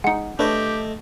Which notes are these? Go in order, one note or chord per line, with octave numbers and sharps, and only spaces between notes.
G#3 D#4 F#5 C#7
A3 D4 G4 B4 C#5 D#5